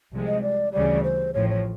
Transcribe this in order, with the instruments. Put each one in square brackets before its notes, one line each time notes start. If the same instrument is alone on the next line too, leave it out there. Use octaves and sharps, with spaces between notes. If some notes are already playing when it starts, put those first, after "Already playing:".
[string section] C2 C3 F3 G#3
[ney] D#5
D5
[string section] D2 C#3 E3 G3 [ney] D5
[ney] C5
[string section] A1 A2 F3 [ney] C#5
[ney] C#5